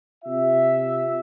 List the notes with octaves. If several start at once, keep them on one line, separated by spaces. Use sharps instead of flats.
C3 F4 E5